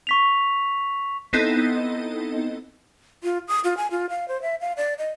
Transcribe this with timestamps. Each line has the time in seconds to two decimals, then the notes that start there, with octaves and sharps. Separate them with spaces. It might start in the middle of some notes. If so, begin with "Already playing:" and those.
0.07 C#6 B6 F7
1.33 B3 C4 D#4 E4 A4 D#5
3.24 F4
3.48 D#6
3.64 F4
3.77 G#5
3.91 F4
4.10 F5
4.28 C5
4.42 E5
4.61 F5
4.77 D5
4.98 D#5